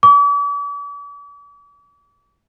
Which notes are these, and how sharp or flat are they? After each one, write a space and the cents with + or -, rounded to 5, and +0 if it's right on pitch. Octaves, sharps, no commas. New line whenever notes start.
D6 -45